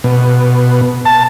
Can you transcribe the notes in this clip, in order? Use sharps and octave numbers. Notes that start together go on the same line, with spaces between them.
B2
A5